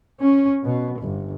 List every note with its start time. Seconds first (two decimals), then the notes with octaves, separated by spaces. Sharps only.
0.24 C#4
0.64 B2
0.99 G1